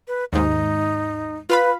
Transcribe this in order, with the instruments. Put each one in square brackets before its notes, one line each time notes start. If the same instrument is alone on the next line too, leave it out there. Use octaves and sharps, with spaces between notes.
[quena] B4
[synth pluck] D#2 G#2 [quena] D#4
[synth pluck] F4 F5 B5 [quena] B4